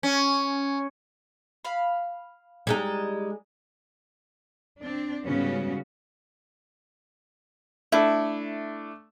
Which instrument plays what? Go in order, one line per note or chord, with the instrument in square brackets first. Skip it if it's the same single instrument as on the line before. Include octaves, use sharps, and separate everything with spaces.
[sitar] C#4
[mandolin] F5 B5
[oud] G3 G#3 D#4
[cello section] C4 D4
G#2 C#3 G3 B3 C#4 F#4
[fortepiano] A3 D4 A4 [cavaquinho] E4